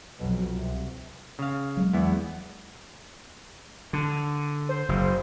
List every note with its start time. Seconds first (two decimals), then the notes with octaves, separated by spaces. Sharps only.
0.17 B1 F2 B2 F3 F#3
0.54 C2 C3
1.39 C#3 F5
1.77 F#3 G#3
1.93 E2 B3 E4
3.93 D3
4.69 C5
4.89 F#1